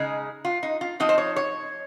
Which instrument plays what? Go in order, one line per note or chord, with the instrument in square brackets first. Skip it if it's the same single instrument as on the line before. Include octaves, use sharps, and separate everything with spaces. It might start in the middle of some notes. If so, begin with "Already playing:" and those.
Already playing: [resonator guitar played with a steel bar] C#3 G#3 D#4 G#4
F4
D#4
F4
F3 C4 D#4 D#5
C5
C#5
C#5